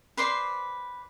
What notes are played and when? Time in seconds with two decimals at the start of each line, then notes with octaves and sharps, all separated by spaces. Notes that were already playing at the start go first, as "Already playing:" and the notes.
0.17 B4 C5 D5 C6